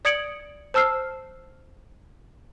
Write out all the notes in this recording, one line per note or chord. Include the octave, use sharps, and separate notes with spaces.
D5 D#6 G#6 C#7 D7 F#7
C5 A5 E6 F6 C7